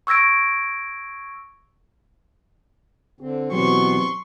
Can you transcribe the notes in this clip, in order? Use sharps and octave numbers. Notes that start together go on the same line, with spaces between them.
C#6 E6 G#6 A#6 D7
D3 C4
B2 E3 F#3 B3 C4 G4 C6 C#6